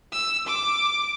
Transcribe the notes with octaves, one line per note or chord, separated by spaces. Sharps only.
E6
D6